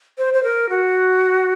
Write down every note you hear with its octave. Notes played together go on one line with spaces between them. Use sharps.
C5
C5
A#4
F#4